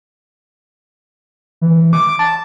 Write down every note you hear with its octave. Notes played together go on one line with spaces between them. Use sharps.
E3
D6
A5